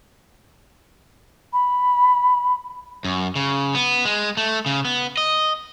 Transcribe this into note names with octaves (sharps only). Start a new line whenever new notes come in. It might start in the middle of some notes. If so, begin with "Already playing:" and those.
B5
F#2
C#3
B3
G#3
A3
C#3
B3
D#5